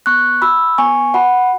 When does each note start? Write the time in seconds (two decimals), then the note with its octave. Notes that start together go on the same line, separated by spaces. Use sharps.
0.06 B3 C#6 F#6
0.42 F#4 B5 E6
0.78 B3 G#5 C#6
1.14 F#4 F#5 B5